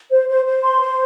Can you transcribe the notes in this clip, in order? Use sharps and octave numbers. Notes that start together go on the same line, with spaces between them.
C5
C5
C5
C6
C5